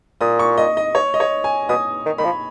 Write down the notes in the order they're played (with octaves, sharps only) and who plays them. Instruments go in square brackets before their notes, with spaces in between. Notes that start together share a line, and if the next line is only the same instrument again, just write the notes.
[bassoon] A#2 [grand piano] D#6
[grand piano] C#6
D#5
D#5
C#5
D#5
C#5
G#5
[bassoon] B2 [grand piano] D#6
[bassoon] D#3
[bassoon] D#3 [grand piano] B5
[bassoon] F3